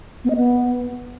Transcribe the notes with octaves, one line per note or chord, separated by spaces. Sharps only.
B3
D#5
B3